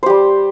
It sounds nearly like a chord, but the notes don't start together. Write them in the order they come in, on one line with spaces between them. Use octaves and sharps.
C5 G4 G3